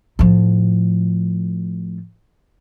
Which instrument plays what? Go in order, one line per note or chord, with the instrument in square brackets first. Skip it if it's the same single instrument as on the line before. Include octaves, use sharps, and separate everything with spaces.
[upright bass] A2 F3